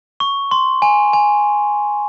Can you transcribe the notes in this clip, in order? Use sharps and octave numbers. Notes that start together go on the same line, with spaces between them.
C#6
C6
G#5
G#5